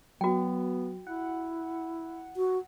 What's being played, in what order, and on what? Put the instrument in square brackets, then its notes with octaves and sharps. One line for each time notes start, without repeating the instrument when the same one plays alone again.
[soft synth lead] F#3 [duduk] B3 [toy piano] F#4 G5
[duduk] E4 [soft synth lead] F#5
[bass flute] F#4